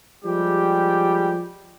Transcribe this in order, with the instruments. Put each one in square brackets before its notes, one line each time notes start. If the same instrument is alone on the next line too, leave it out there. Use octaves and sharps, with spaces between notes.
[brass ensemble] F3 G3 G#3 G4